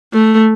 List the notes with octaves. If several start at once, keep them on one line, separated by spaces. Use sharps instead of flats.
A3